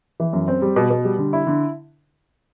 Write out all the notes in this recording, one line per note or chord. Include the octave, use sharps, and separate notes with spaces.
E3
F#2
C4
G3
B2
B2
G3
D3
E4
D3